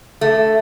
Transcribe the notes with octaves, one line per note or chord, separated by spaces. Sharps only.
A3